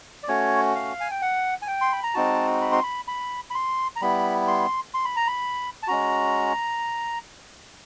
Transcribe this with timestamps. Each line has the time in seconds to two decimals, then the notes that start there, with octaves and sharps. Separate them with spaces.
0.23 D5
0.28 A3 C#4 F#4 C#5
0.75 F5
1.00 G#5
1.11 G5
1.22 F#5
1.62 G#5
1.67 G5
1.81 C6
1.92 B5
2.03 A#5
2.14 G#3 C4 D#4 F#4 A5
2.61 B5
2.72 C6
2.83 B5
3.08 B5
3.50 B5
3.55 C6
3.96 A#5
4.01 G3 B3 E4 B5
4.47 C6
4.94 C6
5.05 B5
5.16 A#5
5.28 B5
5.83 A5
5.87 G#3 C#4 F#4 A#5